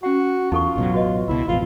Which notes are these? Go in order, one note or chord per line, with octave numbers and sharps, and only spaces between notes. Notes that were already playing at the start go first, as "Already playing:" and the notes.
C#4 F#4 F#5
E2 D#4 F4 A4 C#6
A1 B2 F#3
F#4 B4 D#5
C#2 B2 E4
A1 F2 B2 F4